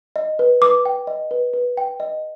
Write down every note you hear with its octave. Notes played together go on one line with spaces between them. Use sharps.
D#5
B4
B4 D6
G5
D#5
B4
B4
G5
D#5